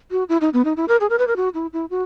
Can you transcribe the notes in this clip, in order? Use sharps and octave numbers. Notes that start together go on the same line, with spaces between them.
F#4
E4
D#4
B3
D#4
E4
A#4
G#4
A#4
B4
A#4
F#4
E4
E4
F#4